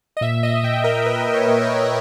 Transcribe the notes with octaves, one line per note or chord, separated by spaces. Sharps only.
D#5
A#2 E5
A#2 D#5
A#2 G5
A#2 A#4
A#2 B4
A#2
C#5
A#2
C#5
A#2